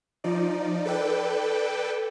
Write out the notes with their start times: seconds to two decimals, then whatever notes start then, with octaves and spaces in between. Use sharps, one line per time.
0.24 F3 D#4 D5
0.86 A4 B4 D5 G5